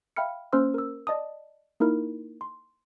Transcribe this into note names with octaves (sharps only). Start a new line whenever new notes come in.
E5 F5 G5 B5 F6 C#7
A#3 C#4 C5 C6 E6 F6
A#4 E6
D5 D#5 A5 D#6
A#3 D#4 E4 A#4
C6